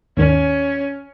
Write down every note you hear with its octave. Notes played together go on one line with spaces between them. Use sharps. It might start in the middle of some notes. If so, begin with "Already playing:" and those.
D#2 G#2 D#3 C#4